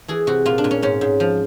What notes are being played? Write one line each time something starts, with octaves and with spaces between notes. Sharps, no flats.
E3 G#4
C3 F#4
A#2 F4
D4
A#2
C#4
G#2 C#4
G#2
F3